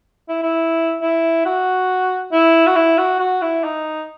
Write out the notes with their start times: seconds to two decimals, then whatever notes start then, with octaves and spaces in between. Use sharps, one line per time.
0.28 E4
0.43 E4
1.01 E4
1.45 F#4
2.32 E4
2.67 F#4
2.75 E4
2.98 F#4
3.19 F#4
3.42 E4
3.63 D#4